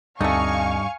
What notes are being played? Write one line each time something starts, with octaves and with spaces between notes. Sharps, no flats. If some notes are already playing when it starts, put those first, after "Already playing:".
D2 G2 A3 C4 D#4 F5 G#5 C#6